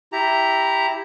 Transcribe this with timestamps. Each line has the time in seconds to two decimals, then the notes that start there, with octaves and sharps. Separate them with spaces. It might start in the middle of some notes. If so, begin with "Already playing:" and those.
0.13 E4 G4 A#5